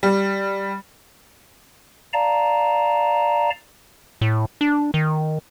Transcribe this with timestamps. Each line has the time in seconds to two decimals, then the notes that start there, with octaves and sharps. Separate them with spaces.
0.03 G3
2.13 D5 F5 A5 A#5
4.21 A2
4.61 D4
4.94 D#3